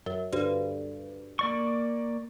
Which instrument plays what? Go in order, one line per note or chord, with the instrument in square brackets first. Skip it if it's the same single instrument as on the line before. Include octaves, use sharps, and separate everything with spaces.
[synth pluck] F#2
D2 G2
[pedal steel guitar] A#3 D5 C#6